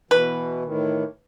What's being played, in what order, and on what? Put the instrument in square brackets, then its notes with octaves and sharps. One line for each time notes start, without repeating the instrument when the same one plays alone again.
[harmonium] B2 E3 [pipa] B4
[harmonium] A2 D#3 E3